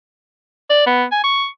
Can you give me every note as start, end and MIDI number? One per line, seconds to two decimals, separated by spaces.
0.70 0.85 74
0.86 1.04 59
1.12 1.24 80
1.24 1.46 85